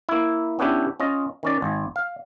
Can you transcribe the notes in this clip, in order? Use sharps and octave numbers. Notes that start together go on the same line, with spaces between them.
A#3 E4
B3 C#4 D4 E4 G4
C#4 F4 D#5
D#3 C#4 D5
G#1
F5